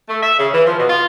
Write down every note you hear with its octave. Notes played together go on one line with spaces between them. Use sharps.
A3
E5
C#3
E3
F3
B2
F4